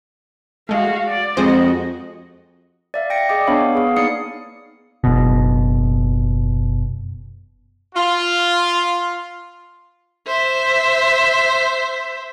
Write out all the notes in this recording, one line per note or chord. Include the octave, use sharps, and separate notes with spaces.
G#3 A3 F#4 F5
D5
F2 G#3 F#4 G#4 C5 D#5
D5 E5 F5
G5 A#6 C#7
G#4 D5 D#5 G5 D6
B3 D4 C#5 F5 B5
B3 G#4 F5
A#3 D#4 D5 D#6 C7 C#7
F#1 B2
F4
C5 E5